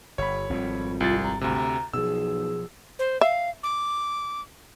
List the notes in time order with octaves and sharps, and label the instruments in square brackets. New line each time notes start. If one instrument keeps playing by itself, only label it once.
[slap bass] G1 [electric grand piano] C#5 B5
[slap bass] G#1 G3 [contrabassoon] F2
[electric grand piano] C2 A6 [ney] F4
[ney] A#5
[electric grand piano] D2 C3 [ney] A#5
[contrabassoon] B1 [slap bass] B2 F3 [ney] G#4 [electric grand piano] E6
[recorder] C5
[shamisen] E5 [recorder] F5
[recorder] D6